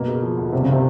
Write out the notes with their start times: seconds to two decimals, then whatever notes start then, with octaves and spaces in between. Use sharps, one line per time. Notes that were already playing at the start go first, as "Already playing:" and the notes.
Already playing: F#2 B2 A#3
0.08 C#3
0.23 F3
0.37 D2
0.52 G2 C3
0.63 C#3
0.69 C3 D#3